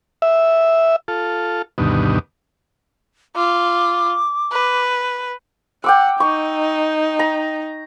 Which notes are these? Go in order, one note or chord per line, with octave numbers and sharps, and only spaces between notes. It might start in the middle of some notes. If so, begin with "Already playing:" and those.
E5
F4 A4
D2 G2 B2 D#3
F4 D6
B4
F#5 G5 D6 E6
D#4 C#6
A#5